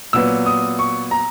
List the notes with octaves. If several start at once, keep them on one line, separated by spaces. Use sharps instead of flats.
A#2 F#3 B3 E6
D#6
C#6
A#5